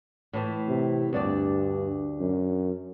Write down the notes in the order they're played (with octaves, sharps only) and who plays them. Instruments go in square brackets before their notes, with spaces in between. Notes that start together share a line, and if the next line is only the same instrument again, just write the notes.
[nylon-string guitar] A2 E3 A3
[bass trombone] C3
[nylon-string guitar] D2 D4 D5 [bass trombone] G2
[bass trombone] F#2